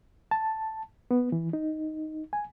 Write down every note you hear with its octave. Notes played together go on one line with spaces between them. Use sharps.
A5
B3
E3
D#4
G#5